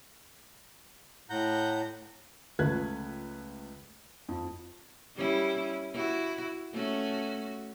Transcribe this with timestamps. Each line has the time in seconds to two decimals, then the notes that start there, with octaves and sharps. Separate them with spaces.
1.30 A2 F#5 A#5 G6
2.59 C#2 F3 A3 B4 F#6 G#6
4.29 F2
5.16 G3 C#4 E4
5.94 E4 F#4
6.73 A3 C#4 F#4